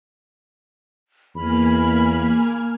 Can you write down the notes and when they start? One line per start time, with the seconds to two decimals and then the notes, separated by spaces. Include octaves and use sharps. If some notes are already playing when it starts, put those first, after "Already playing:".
1.35 E2 A#3 G#5 B5 F6